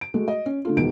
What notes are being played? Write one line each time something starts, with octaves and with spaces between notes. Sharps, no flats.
D7
G#3 A3 F#4
D#5
C#4
D3 A3 F4
E1 E2 D#3 D7